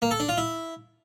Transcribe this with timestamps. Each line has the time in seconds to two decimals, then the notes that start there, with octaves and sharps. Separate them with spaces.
0.02 A#3
0.11 A4
0.20 D4
0.29 F4
0.38 E4